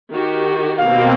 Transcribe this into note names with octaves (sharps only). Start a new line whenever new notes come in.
D#3 F#4 G4
B2 A#3 C4 F5